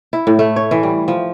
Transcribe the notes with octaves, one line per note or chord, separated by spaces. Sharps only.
E4
A2
A3
C#5
E3
G3
F3